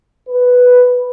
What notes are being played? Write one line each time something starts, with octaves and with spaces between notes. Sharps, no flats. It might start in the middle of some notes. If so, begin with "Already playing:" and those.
B4